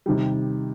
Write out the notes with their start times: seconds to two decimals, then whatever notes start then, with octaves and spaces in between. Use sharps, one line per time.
0.06 C3 D#3 G3